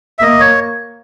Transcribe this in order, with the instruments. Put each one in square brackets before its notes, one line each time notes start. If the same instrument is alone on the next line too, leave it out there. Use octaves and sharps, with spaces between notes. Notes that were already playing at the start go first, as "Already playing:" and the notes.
[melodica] E5
[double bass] A#3 [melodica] D#5
[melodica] C#5